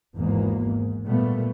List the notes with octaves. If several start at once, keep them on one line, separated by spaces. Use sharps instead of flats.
G#1 E2 G#2 A#3
G#2
A#2 G3 A3 B3